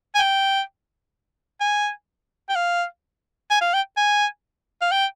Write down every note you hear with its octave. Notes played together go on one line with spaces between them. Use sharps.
G#5
G5
G#5
G5
F5
G#5
F5
G5
G#5
F5
G5